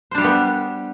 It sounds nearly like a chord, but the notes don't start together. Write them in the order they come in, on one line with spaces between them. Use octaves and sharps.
C5 D4 G3 G4 B3